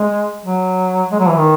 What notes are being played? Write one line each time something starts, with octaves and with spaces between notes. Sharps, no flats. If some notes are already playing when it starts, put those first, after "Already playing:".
Already playing: G#3
F#3
G#3
F#3
E3
D#3